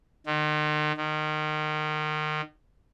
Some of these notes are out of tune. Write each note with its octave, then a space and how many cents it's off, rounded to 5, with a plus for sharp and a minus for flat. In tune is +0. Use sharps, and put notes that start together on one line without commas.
D#3 -40
D#3 -25